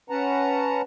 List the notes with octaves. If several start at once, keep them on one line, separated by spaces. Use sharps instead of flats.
C#4 B4 F#5 A5 A#5